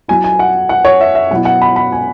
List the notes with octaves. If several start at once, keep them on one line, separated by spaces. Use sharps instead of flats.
F#3 E4 G#5
G#5
F#5
F#5
C#5
E5
E5
B2 F#3 E4 F#5
F#5
B5
B5
G#5